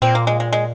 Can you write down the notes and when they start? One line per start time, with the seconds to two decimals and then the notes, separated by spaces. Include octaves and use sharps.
0.02 A#2 C4
0.15 A#3
0.27 G#3
0.40 G#3
0.53 G#3